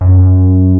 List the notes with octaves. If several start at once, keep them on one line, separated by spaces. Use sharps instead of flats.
F#2